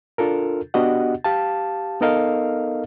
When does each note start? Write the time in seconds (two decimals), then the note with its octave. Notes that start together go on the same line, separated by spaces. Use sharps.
0.18 D4 F4 A4 A#4
0.74 B3 D4 F#4 G4 D#5 F#5
1.24 G4 F5 A5
2.01 B3 D#4 A4 A#4 D#5 F5